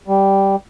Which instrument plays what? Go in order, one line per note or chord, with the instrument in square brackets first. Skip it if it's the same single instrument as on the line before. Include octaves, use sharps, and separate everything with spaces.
[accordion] G3